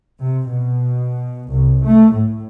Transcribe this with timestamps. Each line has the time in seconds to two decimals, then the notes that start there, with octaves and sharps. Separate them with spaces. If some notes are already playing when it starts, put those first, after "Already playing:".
0.23 C3
0.52 B2
1.51 C2
1.85 A3
2.14 A2